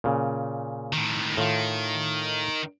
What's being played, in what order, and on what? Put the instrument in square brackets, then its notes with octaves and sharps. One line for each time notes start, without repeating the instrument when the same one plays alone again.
[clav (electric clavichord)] A#2 C#3
[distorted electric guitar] A2 D#3
[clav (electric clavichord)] A2 F4 [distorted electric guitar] D#3